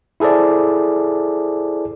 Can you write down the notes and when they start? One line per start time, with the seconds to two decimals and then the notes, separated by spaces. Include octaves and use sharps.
0.20 E4 G#4 A4 C5 D5